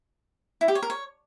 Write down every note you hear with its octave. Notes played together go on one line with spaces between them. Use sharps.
E4
G4
C#5
A#4
C#5